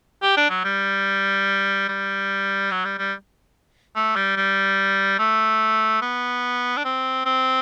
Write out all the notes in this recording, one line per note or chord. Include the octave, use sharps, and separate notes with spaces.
G4
D4
F#3
G3
G3
F#3
G3
G3
A3
G3
G3
A3
B3
D4
C4
C4